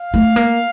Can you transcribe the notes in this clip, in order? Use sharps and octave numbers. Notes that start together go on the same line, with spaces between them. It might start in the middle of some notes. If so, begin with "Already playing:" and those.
Already playing: F5
A3
A#3